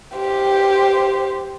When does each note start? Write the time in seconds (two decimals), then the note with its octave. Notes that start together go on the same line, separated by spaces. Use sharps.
0.15 G4 C5